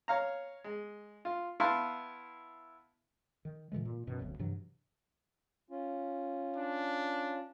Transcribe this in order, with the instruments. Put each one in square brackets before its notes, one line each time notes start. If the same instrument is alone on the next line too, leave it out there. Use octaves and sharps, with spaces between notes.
[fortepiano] C#5 F5 A#5
G#3
F4
B3 E4 F5 A5 C6 C#6
[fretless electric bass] D#3
A#2 D3 E3 G#3
A#2
F#2 B2 D#3
F1 D2 F#3
G2 C3 E3 F#3
[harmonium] C#4 F4
[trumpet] D4